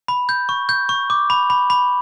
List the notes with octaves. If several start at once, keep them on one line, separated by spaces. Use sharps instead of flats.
B5
G6
C#6
G6
C#6
D6
B5
B5
B5